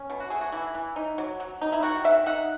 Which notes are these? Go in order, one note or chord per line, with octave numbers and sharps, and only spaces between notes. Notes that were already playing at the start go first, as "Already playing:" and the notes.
Already playing: C#4
B2
F#4
A3 G#4
F#4
E3 E4
E3
D#4
F#3
F#3
D#4
E4
D#3 F#4
D#3 E5
D#4 F#5